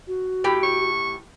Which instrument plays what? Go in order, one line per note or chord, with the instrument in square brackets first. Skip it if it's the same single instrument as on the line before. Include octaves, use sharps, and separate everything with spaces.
[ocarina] F#4
[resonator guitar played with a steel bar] A2 G4 G5
[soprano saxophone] C#6